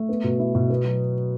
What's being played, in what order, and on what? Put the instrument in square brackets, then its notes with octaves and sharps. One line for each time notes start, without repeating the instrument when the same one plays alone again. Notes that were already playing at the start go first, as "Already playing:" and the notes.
Already playing: [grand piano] A3
B3
B2
E4
B2
B3
F#3